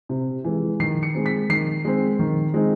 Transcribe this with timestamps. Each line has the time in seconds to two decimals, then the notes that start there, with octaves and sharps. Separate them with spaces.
0.09 C3
0.44 E3 G#3
0.80 D#3 C7
1.03 C#7
1.15 G#3 C4
1.26 B6
1.49 D#3 C7
1.85 G#3 C4
2.19 D#3
2.54 G#3 C4 D#4